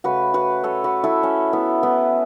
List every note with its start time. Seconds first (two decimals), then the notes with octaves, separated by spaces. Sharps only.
0.04 C#3 A3 F#4 B4
0.34 F#4 B4
0.64 A4 C#5
0.84 F#4 B4
1.04 E4 A4
1.23 C#4
1.53 B3 E4
1.83 B3 E4